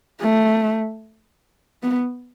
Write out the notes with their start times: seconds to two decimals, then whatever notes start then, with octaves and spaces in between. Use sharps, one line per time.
0.21 A3
1.83 B3